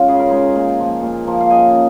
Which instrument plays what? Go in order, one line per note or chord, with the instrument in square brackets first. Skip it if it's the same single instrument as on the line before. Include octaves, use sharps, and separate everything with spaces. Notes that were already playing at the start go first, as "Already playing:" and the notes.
Already playing: [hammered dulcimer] G#3 C#4 F4
C#3 G#4
A#4
G#3 D#4 G#4
A#2
F3 A#3
A#2
F3 A#3
F5
C#3 D#5 G#5